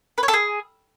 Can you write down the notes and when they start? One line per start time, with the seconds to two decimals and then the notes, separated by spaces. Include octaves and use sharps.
0.18 B4
0.23 C#5
0.28 A4
0.33 G#4